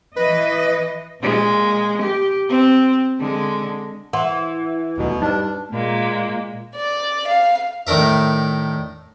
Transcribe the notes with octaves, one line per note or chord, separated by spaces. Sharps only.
E3 B4 D#5
A#2 G#3
G4
C4
D3 G#3
E3 F#5 C6
D#1 D2 B2 F#3
G2 D4 D#4 B4
A#2 G#3 A#3
D5
F5
A2 D#3 D4 A#4 E5